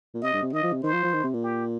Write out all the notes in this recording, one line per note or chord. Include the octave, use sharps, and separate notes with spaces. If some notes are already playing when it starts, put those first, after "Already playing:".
A#2
C3 D#5
G2
C3
D#3 D#5
F3
C3
D#3 C5
F3
F3
D#3
C3
A#2
G4